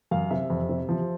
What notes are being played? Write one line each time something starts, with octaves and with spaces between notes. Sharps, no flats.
F#2 F5
C3 E5
F2
C3
F3